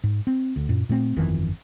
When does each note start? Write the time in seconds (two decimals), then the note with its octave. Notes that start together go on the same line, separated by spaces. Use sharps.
0.04 G#2
0.27 C4
0.56 D2
0.69 F#2 A#2
0.89 A#2 A3 C4
1.17 G1 F2 D#3 E3